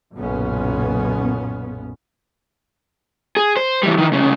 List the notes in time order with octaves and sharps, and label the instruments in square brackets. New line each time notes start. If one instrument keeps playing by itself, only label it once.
[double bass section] F#1 B1 A#2 B3 C#4
[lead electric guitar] G#4
C5
E3 G3
D#3 E3
C2 C#3